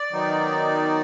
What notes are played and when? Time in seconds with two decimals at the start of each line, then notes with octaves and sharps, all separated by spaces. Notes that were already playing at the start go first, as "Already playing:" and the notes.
Already playing: D5
0.11 D#3 F#3 B3 D#4